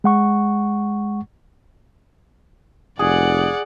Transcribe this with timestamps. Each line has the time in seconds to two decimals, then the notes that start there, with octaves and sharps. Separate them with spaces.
0.04 G#3 F#5 C#6
2.99 F1 G#4 D5 F#5